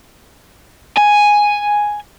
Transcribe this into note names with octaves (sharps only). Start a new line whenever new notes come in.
G#5